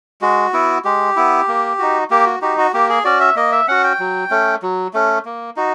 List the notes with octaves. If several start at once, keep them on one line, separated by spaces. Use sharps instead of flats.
G#3 F#4
B3 E4
G#3 G4
B3 E4
A#3
D#4 F#4
A#3 G4
F#4
D#4 F#4 G4
F#4
A#3 G4
G#4
C#4 F#4 D5
E5
A#3 D#5
E5
C#4 F#4 F#5
G5
F#3
A3 C#4
F#3
A3 C#4
A#3
D#4 F#4